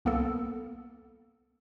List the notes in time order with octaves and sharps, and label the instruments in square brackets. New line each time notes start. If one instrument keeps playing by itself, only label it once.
[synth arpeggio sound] C2 A#3 B3 A4